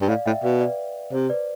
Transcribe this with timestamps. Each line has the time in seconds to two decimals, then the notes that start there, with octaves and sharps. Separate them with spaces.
0.01 G2
0.09 A2 D5 F5
0.26 A2 E5 G5
0.43 B2 D5 F5
0.61 B4 D5
1.12 C3 C5
1.30 B4 D5